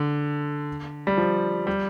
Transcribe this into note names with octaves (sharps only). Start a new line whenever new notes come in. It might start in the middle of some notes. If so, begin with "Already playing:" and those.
Already playing: D3
G3
F3
G3